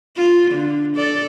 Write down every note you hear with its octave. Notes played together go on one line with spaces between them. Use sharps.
F4
D3
A4 D5